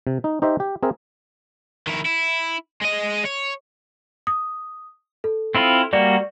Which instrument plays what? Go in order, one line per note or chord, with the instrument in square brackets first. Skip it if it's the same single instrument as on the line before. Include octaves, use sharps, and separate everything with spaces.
[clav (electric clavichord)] C3
D#4
D#4 G4 C5 D#5 E5
G4
C4 G#4 A#4 E5
[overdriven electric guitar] D#3 E4
E4
G#3 D#5
C#5
[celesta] D#6
A4
[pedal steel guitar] C4 E4 F4
[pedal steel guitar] G3 A#3 F#4 [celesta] D5